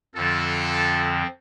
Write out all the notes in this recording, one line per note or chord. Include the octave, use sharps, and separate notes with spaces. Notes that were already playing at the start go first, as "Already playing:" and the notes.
F2 D3 F3 C4 F4 A4